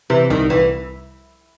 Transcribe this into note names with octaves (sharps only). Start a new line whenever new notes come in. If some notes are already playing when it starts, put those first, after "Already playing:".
C3 E3
C2 D#3
C2 E3